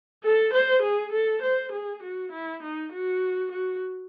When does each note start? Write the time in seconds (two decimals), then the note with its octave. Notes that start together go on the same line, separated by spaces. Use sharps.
0.24 A4
0.53 C5
0.82 G#4
1.12 A4
1.43 C5
1.72 G#4
2.03 F#4
2.32 E4
2.63 D#4
2.92 F#4
3.52 F#4